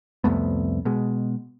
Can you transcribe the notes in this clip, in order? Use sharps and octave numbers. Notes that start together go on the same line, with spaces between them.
C2 F2 A3 B3
B2 G#3